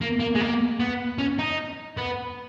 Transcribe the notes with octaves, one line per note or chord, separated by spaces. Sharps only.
A#3
A#3
G#3
A#3
B3
C#4
D#4
B3